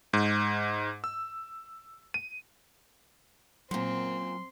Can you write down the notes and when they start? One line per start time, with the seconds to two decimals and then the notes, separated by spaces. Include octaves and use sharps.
0.13 G#2
1.04 E6
2.14 D#7
3.71 F#2 A#2 F#3 C4 C6